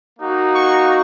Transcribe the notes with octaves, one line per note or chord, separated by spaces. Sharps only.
A#3 D#4 F#4
C#6